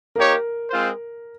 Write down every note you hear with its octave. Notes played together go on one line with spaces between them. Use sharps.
A#3 D#4 G4 A#4 C#5
G#3 C4 F4 C5